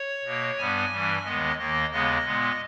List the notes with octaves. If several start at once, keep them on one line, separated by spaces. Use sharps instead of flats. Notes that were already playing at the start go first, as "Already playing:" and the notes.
Already playing: C#5
B2 A#3
G2 G3 B3 G#5
G2 E3 G3
D#2 D#3 G#3 B3 D#5
D#2 D#3 A#3 D#5
D#2 C#3 G#3 B3 D#5
A#2 G#3 B3